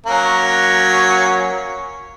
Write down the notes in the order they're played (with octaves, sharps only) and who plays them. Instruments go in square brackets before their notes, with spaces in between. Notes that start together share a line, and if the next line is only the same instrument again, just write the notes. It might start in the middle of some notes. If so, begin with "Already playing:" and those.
[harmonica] F#3 A#3 C#4